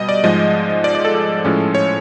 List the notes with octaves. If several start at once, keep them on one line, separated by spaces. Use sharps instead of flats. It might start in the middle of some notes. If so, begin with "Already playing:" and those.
Already playing: B2 G3 D#5
D5
G#2 F3 G#3 D#5
D5
D5
A4
A4
A2 F3 G#3 C#4
C#5